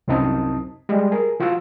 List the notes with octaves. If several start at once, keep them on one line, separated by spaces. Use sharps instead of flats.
C2 F#2 C4 D#4 A5 D#6
G3 G#3
G#4 A#4
F3 F4 F#4 F#5 E6